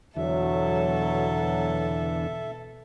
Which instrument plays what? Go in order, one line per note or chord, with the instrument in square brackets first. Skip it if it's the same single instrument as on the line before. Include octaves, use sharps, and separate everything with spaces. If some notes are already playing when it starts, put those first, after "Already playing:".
[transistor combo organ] E2 D3 [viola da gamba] B2 A4 [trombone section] F#3 [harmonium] E5